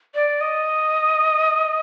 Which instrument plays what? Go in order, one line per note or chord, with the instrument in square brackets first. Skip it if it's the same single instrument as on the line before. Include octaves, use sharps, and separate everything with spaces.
[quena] D5
D#5